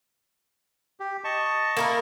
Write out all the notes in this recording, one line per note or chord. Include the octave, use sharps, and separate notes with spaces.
G4
D#5 A5 C#6
A#3 E4 A#4